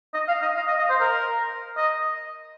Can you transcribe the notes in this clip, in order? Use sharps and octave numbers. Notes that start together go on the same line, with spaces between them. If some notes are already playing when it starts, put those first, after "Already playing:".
D#5
F5
D#5
F5
D#5
D#5
C5
A#4
D#5